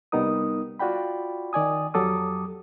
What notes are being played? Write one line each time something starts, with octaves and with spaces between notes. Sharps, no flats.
C2 G3 B3 D#4 A#4 D#6
F4 F#4 D5 G5 B5
D#3 D5 G#5 D#6
F2 F#3 G4 A4 D6 D#6